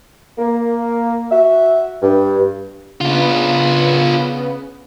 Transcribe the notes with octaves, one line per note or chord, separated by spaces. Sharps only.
A#3
F#4 E5
G2
C#3 B3 D4 F4